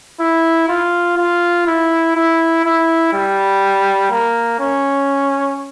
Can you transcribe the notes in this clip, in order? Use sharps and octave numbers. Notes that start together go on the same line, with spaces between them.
E4
F4
F4
E4
E4
E4
G3
A#3
C#4